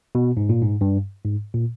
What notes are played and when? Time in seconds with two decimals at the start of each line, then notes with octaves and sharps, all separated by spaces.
0.15 B2
0.37 G#2
0.49 A#2
0.62 G#2
0.81 G2
1.25 G#2
1.54 A#2